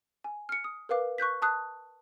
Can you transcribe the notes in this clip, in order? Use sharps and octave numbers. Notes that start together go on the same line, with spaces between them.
G#5
F6 C#7
D#6
A#4 B4 F5 D6
C#6 F#6 G6 B6
A5 D#6 F#6